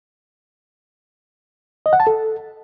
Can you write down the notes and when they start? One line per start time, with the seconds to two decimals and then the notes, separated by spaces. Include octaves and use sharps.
1.86 D#5
1.93 F#5
2.00 A5
2.07 A4